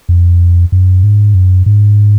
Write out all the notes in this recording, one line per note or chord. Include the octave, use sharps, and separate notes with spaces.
F2
F#2
G#2
F#2
G#2